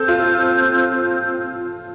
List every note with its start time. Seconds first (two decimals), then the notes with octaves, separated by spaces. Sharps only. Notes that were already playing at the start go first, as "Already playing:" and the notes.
Already playing: C4 A4
0.08 F4